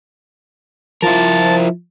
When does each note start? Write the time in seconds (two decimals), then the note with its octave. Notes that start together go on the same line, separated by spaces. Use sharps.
1.02 F3 E4 A#4 A5